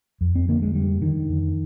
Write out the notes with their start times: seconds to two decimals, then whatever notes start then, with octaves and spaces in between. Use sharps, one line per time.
0.21 F2
0.35 C4
0.49 D3 A#3
0.62 G#3
0.74 F2 G3
1.02 D3 D#3
1.29 F2